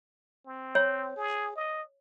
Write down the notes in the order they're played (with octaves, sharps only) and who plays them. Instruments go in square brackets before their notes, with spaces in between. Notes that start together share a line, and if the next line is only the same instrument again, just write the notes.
[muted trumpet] C4
[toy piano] C#5
[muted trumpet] G#4
D#5